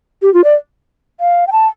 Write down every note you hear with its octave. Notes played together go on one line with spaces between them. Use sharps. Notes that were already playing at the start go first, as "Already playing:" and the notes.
G4
F4
D5
F5
G5
A5